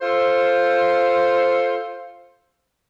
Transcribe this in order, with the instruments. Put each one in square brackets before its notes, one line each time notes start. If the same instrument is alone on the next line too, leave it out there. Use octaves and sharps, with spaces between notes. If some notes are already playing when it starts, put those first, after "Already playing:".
[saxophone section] F4 A4 C5